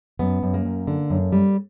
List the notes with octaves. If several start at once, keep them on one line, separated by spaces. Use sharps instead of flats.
F#2 B3
F#2
A#3
F#2
D3
F#2
G3